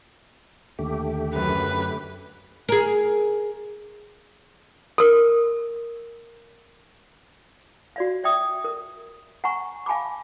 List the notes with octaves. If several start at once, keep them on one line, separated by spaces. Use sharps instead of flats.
D#2 D3 A3 G4
F#2 B4
G#4 A#4
A4 A#4
F#4 D5 F5
D5 E5 G5 D#6
A#4
F#5 G#5 A#5 C#6
F5 G#5 A5 B5 D6